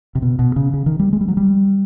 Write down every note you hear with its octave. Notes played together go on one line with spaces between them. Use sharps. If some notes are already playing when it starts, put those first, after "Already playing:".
C3
B2
B2
C#3
C#3
D#3
G3
G#3
G3
F#3
G3